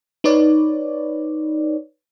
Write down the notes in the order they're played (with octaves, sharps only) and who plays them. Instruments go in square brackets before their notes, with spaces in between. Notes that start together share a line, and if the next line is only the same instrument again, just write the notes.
[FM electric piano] D#4 B4 C#5 D5